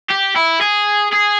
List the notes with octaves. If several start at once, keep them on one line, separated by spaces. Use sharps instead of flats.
G4
E4
G#4
G#4